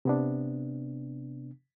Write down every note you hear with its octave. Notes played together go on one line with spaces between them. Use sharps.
C3 B3 D4